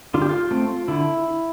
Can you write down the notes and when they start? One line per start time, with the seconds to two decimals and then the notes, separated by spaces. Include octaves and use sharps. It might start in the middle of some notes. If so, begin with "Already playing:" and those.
0.14 D3 F4
0.22 G4
0.29 F4
0.51 A3 C4
0.88 D3 E4